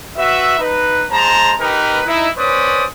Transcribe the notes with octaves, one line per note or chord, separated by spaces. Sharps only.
F#4 B4 E5
D#4 B4
G#3 C5 A5 A#5
D#4 G4 A#4 B4
D#4 E4
C#4 B4 C5 D5 D#6